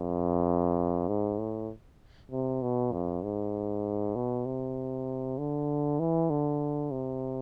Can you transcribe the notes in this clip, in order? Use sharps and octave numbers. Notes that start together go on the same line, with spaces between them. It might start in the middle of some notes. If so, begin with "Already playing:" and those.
Already playing: F2
G#2
A2
C3
B2
F2
G#2
B2
C3
D3
E3
D3
C3